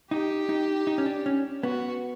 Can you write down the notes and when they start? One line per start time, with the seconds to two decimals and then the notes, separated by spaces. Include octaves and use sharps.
0.11 D#4 G4
0.49 D#4
0.87 D#4
0.98 C#4
1.06 D4
1.26 C#4
1.63 B3 F#4